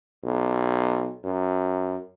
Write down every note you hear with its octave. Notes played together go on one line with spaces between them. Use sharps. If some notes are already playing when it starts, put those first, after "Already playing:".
B1
F#2